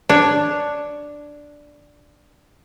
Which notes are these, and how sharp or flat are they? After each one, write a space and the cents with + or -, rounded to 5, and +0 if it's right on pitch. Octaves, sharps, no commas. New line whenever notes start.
D4 +0 C#5 +0